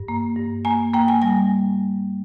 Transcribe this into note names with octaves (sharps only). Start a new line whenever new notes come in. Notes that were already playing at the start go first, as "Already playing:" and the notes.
Already playing: G2
A#3
G2
A#3 G#5
A#3 G5
G#5
G3 G#5